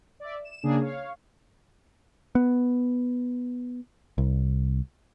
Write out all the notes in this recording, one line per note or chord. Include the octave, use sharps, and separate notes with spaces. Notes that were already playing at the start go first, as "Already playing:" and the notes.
D5 E5
E7
C#3 A#3 D4 G#4
C#5 F5
B3
C2